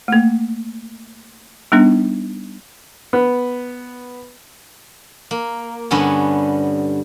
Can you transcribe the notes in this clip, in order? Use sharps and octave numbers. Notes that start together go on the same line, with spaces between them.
A3 A#3
G3 B3 D4 D#4
B3
A#3
G2 D3 B3 C#4 G#5